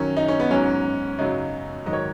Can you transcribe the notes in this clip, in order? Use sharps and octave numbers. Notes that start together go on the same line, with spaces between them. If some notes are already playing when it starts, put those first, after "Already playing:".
Already playing: F#2 D#3 F#3 C#4
D#4
C#4
B3
G#2 F#3 C#4
F#2 C#3 F#3 D#4
G#2 D#3 F#3 D#5
C#5